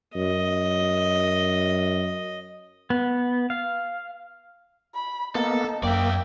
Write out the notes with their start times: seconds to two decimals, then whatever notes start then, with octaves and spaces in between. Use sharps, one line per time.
0.15 F#2 D#5
2.90 B3
3.50 F5
4.95 B5
5.35 A#3 B3 D#4 A4
5.83 F#2 A#3 D5 E5 G5